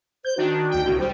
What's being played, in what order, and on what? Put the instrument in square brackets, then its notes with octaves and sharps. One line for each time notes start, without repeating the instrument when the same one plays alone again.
[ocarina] C5 [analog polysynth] G6
[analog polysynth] D#3 D4 [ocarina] F#4
[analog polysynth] D2 G5
[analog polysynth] C2 A2 [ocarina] F#4
[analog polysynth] G3 [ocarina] C5